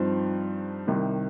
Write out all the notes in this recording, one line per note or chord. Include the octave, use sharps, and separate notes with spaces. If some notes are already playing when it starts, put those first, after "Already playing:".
Already playing: G2 F3 C4 D#4
C2 C3 D#3